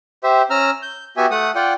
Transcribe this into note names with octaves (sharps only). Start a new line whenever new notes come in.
G4 C5 E5
C#4 A#5 E6 F6
G6
B3 F#4 G4 E5 G#5
A3 F#5 D#6
F4 D5 F#5 G5